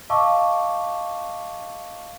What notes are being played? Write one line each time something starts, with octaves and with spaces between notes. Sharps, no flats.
D#5 F5 A5 C#6 D6 E6